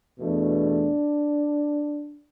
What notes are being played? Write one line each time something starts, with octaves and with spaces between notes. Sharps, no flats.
E2 B2 A3 D4